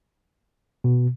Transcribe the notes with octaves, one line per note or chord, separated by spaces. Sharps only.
B2